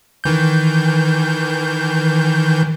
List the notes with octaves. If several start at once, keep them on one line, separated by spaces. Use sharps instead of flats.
D#3 E3 G6